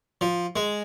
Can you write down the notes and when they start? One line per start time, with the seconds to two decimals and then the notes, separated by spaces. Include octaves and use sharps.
0.21 F3
0.56 G#3